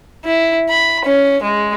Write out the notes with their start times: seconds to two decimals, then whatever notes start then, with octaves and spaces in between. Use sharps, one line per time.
0.25 E4
0.70 B5
1.05 C#4
1.43 G#3